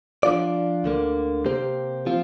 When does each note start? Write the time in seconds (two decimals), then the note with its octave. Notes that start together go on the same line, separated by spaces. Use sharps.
0.23 F3 D4 F4 D5
0.84 D2 D3 A#3
1.45 C3 A#3 G4 C5
2.06 F3 C4 F4